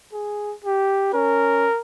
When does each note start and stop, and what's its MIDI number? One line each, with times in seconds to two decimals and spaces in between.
0.13 0.54 68
0.64 1.09 67
1.14 1.69 61
1.14 1.81 70